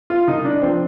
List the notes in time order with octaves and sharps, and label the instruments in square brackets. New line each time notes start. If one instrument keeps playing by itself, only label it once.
[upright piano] F4
C2 D#4
D4
F3 C4